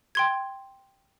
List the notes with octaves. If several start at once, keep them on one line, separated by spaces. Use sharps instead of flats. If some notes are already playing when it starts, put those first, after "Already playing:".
G5 C6 G#6